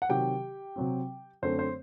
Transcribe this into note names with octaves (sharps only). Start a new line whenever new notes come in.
F#5
C3 D#3 F#3 G4 G5
C3 F#3 C4
F#2 D3 A3 C4 C5
C5